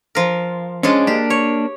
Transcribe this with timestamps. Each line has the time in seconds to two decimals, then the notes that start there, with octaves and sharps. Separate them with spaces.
0.15 F3 A#4
0.83 F3 G#3 C#4 D4
1.07 A#3 D4 G4
1.30 C#5